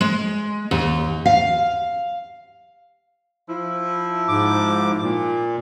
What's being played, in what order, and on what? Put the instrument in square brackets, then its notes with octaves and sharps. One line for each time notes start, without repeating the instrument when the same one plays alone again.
[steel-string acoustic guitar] G#3
D#2
F5
[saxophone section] F3 E4
[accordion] G#2 D6
A#2